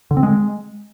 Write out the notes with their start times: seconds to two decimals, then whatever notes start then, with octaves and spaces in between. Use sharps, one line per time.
0.11 D3
0.17 C4
0.23 G#3